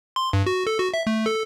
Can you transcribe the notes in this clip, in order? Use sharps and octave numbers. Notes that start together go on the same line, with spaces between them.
C6
G2
F#4
A4
F#4
E5
A3
A4